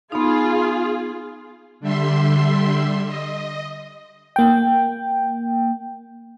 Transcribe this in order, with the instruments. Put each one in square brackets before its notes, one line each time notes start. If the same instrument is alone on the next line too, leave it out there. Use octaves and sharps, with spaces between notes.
[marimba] B3 D#4 [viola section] F4 G#4
[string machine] D3 G3 E5 C6
D#5
[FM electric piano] A#3 G5